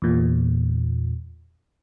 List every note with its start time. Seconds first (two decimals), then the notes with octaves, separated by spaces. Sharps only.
0.02 E2 A#2